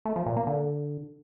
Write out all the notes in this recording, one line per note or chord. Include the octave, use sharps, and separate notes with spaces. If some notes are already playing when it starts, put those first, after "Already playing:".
A3
F3
A#2
A#3
D3